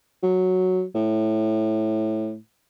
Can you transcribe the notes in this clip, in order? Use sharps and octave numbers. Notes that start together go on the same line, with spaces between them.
F#3
A2